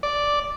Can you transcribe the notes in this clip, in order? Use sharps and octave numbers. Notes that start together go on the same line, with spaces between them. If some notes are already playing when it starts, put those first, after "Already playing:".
D5